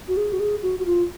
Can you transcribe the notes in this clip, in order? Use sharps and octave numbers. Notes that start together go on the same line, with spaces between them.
F#4
G#4
F#4
G#4
F#4
F#4
F4